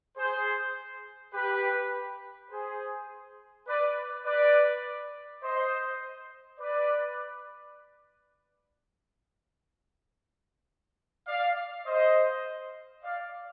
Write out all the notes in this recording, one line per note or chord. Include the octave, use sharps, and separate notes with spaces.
G#4 C5
G4 B4
G#4 C5
B4 D5
B4 D5
C5 D#5
B4 D5
D5 F5
C5 D#5
D5 F5